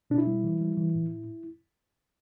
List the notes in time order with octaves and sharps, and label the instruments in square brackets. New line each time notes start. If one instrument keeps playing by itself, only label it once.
[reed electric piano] B2 D4
E4
G3
E3
G3
E3
A2